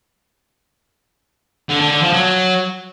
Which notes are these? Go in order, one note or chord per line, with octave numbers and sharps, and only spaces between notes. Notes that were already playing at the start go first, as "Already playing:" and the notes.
D3
D3
D3
F3
F#3